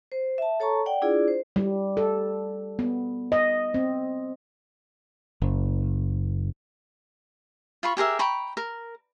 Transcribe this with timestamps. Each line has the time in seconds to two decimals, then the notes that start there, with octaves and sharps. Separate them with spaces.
0.12 C5
0.38 E5 A5
0.60 A4 C#5 A5 A#5 C#6
0.86 D5 F#5 G5
1.02 D4 E4 F4 G#4 D5
1.28 C5
1.56 G3
1.97 A4
2.79 B3
3.32 D#5
3.74 C4
5.42 F#1
7.83 F4 B5 C#6
7.97 G4 G#4 A#4 E5
8.19 G5 A#5 B5 C#6
8.57 A#4